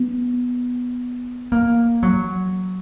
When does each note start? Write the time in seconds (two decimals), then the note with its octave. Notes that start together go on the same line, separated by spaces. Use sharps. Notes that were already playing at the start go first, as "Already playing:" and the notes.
Already playing: B3
1.52 A#3
2.03 F#3